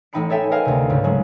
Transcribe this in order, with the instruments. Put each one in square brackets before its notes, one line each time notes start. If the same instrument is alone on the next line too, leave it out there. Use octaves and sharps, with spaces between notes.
[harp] A1 A3 D#4 G5 B5 C#7
G#4 A4 C#5 E5 G5 G#5
A#4 B4 D#5 F5 G#5
D2 C3
C#2 G#2 C#3
F#3 G#3 A3